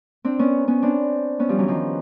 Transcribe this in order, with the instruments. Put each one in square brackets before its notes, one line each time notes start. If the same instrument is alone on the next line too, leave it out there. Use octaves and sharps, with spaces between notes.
[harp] C4 D4
B3 C#4
B3 C#4
C4 D4
B3 C#4
F3 G3
E3 F#3
D#3 F3